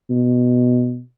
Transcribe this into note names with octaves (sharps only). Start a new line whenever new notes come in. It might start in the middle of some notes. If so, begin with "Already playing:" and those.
B2